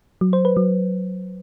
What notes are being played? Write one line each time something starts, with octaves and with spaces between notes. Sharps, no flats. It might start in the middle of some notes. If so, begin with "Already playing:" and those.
F#3
C5
B4
F#3